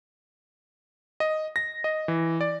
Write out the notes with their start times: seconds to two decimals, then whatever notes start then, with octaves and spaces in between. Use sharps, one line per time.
1.20 D#5
1.56 A#6
1.84 D#5
2.08 E3
2.41 D5